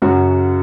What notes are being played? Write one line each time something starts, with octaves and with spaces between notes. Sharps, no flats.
F#2 C#3 F#3 F#4